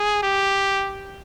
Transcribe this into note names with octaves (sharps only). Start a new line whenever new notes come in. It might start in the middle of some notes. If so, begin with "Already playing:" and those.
Already playing: G#4
G4